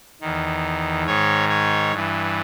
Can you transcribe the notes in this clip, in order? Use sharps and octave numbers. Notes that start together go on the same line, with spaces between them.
E2 D#3
G#2 D#3 C#5
C#5
G2 E3